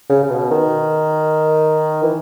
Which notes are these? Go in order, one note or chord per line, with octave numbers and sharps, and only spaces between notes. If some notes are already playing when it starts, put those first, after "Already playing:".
C#3
C#3
B2
D#3
E3